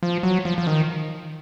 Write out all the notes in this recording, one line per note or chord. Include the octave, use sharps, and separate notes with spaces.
F3
F#3
F3
F3
D#3